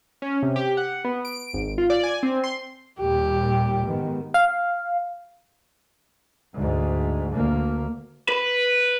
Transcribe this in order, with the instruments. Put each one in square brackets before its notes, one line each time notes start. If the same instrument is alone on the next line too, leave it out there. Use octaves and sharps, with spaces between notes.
[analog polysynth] C#4
C3
G4
F#5
B3
D7
G#1
F4
D5
G#5
C4
C6
[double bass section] D#2 A#2 G3 [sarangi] G4
[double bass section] G#2 D#3 B3
[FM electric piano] F5
[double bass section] D2 G#2
D2 A#3
[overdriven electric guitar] B4